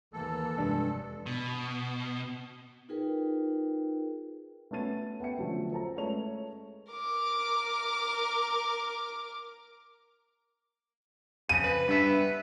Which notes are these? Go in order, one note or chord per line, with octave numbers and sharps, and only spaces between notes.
D#2 E3 A#3 A4
F1 G2 G#3
B2
D#4 F4 G#4 A#4 B4 G5
A3 B3 C#4 A6 D#7
B3 E5 G5 C#7
D3 F3 F#3 A3 C#4
A4 C5 A5 A#5
G#3 A3 C#4 B4 C#5 F7
A#4 D6
F2 C#3 D#7
B4
G2 B3 E5